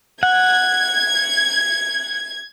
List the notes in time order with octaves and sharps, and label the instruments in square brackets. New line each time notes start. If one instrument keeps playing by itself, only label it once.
[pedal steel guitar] F#5 [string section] G#6